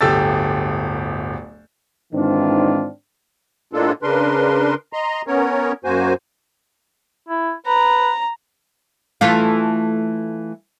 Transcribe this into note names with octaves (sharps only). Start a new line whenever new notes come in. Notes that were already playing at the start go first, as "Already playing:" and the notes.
D1 G1 G4 A4 E6 A6
G#2 D#3 E3 C4 D4 F4
A2 G#3 A#3 D4 F4 A4
C#3 D4 A#4 B4 C6
D#5 A#5 C6
B3 C#4 A#4 C#5
F#2 A#3 F#4 C5 G#5
E4
B4 A#5
E3 A3 F4